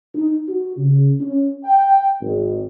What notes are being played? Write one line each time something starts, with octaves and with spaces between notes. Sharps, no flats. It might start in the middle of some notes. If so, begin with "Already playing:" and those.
D#4
F#4
C#3
C#4
G5
G#1